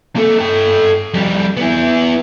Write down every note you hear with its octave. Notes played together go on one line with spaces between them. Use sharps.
A#3 A4
A4 G5
F2 G3
E3 B3